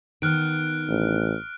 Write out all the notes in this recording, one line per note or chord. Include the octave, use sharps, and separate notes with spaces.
D#3 B3 F6 F#6 D7
A1